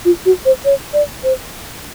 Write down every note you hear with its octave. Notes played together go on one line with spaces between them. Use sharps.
F4
F#4
C5
C#5
D5
C5